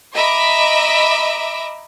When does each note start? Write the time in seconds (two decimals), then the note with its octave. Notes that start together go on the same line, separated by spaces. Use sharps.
0.14 D#5 E5 A#5 B5 D6